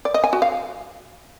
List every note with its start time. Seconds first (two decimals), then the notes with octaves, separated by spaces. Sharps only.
0.05 D5
0.14 D#5
0.24 G#5
0.33 F#4
0.42 F5